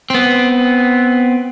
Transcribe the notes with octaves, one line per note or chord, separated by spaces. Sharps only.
B3 C4